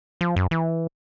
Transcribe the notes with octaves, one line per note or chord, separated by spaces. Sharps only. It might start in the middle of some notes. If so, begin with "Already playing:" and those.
F3
F#2
E3